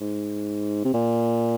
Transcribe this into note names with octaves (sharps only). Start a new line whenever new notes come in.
G#2
C3
A#2